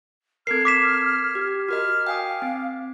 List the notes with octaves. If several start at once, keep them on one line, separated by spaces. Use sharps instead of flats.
C4 A4 A#4 F6 G#6 C7
D6 B6 E7
G4
F#4 A#4 D#5 F6
F5 G5 G#5 D#6
C4